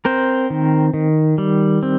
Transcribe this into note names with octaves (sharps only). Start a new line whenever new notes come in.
C4 A#4 C5
D#3
D#3
G3
C4